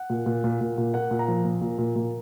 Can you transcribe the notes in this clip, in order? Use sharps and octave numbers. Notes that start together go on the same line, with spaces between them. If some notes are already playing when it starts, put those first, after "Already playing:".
Already playing: F#5
A#2
A#2
A#2
A#2
A#2
A#3 F#5
A#2
A#5
F3
A#2
A#2
A#2
A#2